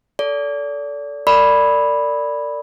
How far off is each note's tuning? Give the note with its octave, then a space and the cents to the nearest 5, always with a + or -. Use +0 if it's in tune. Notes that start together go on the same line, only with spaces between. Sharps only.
A4 +0 D5 -30
A#4 -40 D5 +0 B5 -5